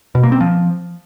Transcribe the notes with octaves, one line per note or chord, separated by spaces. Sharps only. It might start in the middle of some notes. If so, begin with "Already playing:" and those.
B2
A#3
C4
F3